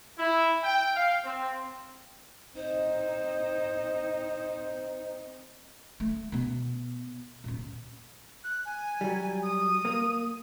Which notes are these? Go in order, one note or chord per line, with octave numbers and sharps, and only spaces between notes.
E4
G5
F5
C4
C4 D#4 C5
A3
B2 B3
D#1 A#2
F#6
G#5
F#3 G3
D#6
A#3